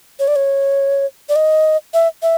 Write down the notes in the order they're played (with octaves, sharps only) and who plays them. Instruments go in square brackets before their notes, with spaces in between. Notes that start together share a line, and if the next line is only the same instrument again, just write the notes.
[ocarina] C#5
D5
C#5
D5
D#5
E5
E5